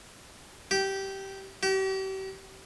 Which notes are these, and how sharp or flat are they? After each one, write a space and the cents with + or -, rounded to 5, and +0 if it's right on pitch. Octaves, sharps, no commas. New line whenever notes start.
G4 -15
G4 -40